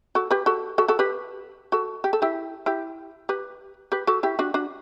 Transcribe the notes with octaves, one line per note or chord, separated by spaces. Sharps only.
F#4 A4
G4 B4
F#4 A4
F#4 A4
F#4 A4
G4 B4
F#4 A4
G4
A4
E4 G4
E4 G4
G4 B4
G4 B4
F#4 A4
E4 G4
D4 F#4
D4 F#4